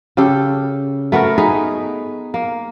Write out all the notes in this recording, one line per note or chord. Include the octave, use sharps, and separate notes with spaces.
C#3 G4 A4
A3 B3 F#4 A#4
D#4 G#4 B4
A#3